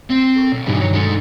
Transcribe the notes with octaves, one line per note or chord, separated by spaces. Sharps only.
C4
A4 A#4 C#6
B1
G2 B2 E3 G3 D#4
D#3 F#3 D#4 C#5
D2 G#3 D#4 A4 C#7